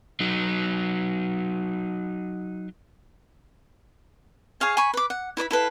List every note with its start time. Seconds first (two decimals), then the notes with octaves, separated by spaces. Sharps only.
0.20 F#3 D#4
4.60 G#4 C#5 F5 G#5
4.77 G#5 B5 C#6
4.94 B4 D6
5.10 F#5
5.37 E4 B4 D5 B5
5.51 E4 A4 B4 F5